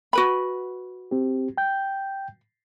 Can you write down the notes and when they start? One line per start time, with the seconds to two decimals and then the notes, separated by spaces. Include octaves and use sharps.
0.13 F#4 B4 B5
1.11 C4 G4
1.58 G5 G6